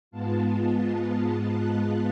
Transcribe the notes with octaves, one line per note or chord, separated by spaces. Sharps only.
G#2 G#3 B3 F4 A5
F#6